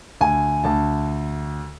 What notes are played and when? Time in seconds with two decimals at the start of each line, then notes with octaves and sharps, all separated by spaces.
0.21 D2 G#5
0.64 D2 A5